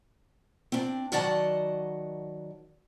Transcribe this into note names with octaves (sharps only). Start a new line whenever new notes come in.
C4 D4
D#3 F#3 D5 D#5 F#5 A5